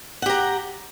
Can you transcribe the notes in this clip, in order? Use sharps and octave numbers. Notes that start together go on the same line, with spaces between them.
G4 F#5 A#5